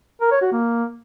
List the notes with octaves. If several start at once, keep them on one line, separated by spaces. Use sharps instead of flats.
A#4
C#5
F#4
A#3